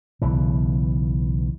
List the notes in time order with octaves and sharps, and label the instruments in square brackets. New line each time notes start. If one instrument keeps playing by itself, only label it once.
[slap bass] B1 C#3 E3